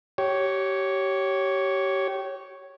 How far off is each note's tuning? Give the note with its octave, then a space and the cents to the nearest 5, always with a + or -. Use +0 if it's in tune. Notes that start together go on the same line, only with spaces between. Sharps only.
G4 -25 C#5 +0